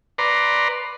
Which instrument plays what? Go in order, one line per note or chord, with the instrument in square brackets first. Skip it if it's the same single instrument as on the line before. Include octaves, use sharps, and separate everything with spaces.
[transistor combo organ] B4 D5 A#5 C6